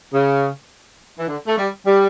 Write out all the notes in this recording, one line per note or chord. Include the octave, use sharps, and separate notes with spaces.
C#3
E3
D3
A3
G3
G3